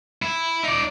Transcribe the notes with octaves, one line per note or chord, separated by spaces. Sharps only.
E4
D#4 D5